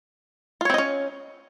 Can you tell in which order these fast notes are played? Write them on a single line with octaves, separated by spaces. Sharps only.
F4 C#5 C4 D#5 C#4